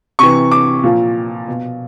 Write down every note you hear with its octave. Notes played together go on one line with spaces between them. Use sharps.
C3 E3 C#6
D6
A#2 F3
B2